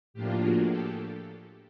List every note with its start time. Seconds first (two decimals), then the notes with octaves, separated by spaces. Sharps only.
0.14 A2 F3 A#3 D4 F4 G4
0.42 F#4 G#4
0.70 G4 A4